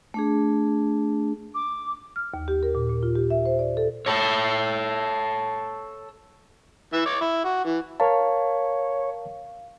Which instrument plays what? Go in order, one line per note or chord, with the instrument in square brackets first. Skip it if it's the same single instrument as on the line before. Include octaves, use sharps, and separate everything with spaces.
[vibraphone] A3 D4 G#4
[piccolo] D6
[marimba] F6
D#2
G4
A#4
A#2
A#2
F4
G4
E5
C5
D5
A4
[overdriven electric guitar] A4 C#5
[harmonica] E3 E5
C#5 D6
E4
F#4
E3
[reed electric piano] A#4 A5 [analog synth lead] C#5 [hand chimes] F5